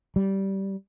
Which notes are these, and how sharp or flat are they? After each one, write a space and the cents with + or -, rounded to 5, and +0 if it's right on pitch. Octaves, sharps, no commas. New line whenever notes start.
G3 -15